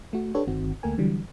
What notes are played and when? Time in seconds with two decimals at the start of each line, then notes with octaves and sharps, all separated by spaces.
0.13 A3 F#4
0.35 D4 G4 A4 B4 C#5
0.47 G1 D#3 C4 F#4
0.83 D2 A3 A#3 A#4 G5 G#5
0.98 D3 E3 F#3 G3